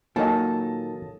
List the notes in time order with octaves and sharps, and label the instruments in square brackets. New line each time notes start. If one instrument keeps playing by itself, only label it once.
[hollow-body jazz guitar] A#2 D#3 [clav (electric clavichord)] F#3 A#3 [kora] A4 [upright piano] D#5 G#5 A5